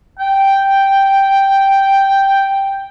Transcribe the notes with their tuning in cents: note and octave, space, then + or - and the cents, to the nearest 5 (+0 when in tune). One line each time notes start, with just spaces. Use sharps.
G5 +0